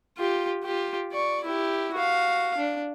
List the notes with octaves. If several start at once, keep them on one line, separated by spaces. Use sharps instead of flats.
F4 G4
F4 G4
D5 C#6
E4 G4
F#4 F5
D4